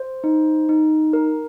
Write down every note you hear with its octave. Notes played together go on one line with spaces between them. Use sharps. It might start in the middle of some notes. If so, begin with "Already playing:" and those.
Already playing: C5
D#4
D#4
A#4